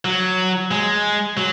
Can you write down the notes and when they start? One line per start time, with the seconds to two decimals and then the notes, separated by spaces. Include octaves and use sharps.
0.05 F#3
0.71 G#3
1.37 F#3